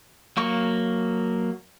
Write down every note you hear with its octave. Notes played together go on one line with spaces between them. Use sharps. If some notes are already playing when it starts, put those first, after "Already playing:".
F#3 A#3 C#6